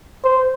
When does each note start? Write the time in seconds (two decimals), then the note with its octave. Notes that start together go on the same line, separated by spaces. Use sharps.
0.25 C5